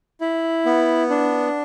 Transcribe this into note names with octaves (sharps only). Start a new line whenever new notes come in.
E4
B3
D4